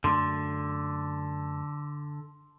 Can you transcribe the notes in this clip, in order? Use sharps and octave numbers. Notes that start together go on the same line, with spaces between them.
F#2 D3 A3 C6